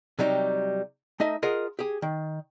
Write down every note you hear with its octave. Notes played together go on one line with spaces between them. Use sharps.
C3 F#3 G3 D#4
A3 D#4 D#5 E5
F4 G#4 A#4 D#5 F#5
G4 G#4
D#3